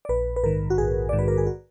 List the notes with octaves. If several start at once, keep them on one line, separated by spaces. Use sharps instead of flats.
D5
A#1 B4
B4
G#2 D#3 A#4
F#4
A#1 G#4
G#2 D#3 D5
B4
A#4
G#4
F#4